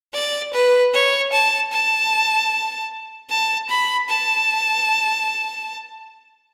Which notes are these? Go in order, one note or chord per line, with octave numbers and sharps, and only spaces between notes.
D5
B4
C#5
A5
A5
A5
B5
A5